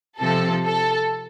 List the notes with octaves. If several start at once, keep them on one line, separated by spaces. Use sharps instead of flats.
C3 F3 C4 A4
A4